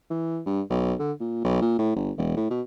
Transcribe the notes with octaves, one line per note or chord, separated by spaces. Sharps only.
E3
G2
B1
D3
A#2
B1
A#2
A2
G1
E1
A2
B2